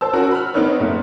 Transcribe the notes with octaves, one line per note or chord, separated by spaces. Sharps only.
C5 A5 E6
C#4 F#4 A#4
B5 F6
B3 C4 D4 D#4 B4 C#5
F#1 A3